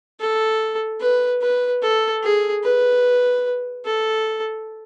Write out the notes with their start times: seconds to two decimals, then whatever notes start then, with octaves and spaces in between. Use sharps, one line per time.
0.20 A4
1.00 B4
1.41 B4
1.82 A4
2.23 G#4
2.63 B4
3.85 A4